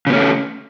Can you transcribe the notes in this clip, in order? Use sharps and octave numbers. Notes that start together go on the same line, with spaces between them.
C#3 A3 B3 C#4